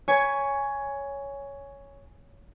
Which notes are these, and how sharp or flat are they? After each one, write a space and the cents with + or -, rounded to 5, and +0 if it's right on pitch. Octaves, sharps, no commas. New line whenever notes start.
C#5 +10 G#5 +0 B5 +0